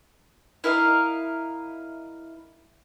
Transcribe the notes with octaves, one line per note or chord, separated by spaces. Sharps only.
E4 A#4 D#5 F5